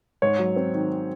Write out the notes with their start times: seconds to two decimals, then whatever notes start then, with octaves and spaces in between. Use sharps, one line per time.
0.22 G#2 C#5
0.39 F#3
0.56 C4
0.74 D#3